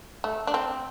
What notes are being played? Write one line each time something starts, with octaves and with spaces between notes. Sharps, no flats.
A3
D4
C4